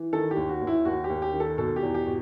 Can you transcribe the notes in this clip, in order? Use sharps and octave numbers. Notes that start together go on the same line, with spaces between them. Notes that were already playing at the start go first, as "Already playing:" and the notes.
Already playing: E3
D#3 A4
G4
D#2
F#4
D#2
E4
D#2 F#4
G4
D#2
G4
D#3
A4
B2 A4
G4
E2
G4
B2